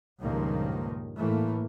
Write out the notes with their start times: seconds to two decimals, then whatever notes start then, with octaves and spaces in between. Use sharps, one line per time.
0.21 C#2 G2 A#2 D#3 F3 A#3
1.18 A2 E3 A3 A#3